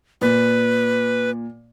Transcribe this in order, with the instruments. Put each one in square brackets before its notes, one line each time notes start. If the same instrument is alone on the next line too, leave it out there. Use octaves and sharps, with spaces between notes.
[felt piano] A#2 [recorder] B4